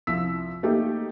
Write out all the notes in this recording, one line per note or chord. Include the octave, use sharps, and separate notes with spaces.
C2 F3 E6 B6
A3 A#3 D#4 G4